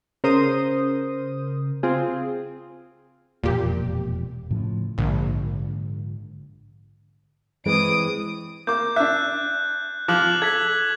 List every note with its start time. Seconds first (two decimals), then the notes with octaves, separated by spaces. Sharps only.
0.24 C#3 A#4 C5 D#6
1.83 C4 F4 G#4
3.44 E1 F2 A#2 G4
4.50 A2 C#3 F3
4.98 A#1 G#2 D3
7.66 E3 G#3 C4 D#6 D7
8.67 A#3 D6 G6
8.96 D4 E5 F#6
10.08 F3 D6 F#6 F#7
10.42 A4 G#6 B6 F#7